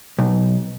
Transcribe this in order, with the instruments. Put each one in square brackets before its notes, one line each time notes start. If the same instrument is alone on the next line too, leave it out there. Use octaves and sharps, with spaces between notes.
[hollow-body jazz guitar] B1